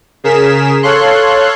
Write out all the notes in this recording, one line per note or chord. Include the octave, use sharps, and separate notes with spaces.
C#3 G#4 A#4 B6 E7
A4 C#5 F5 C6 F#6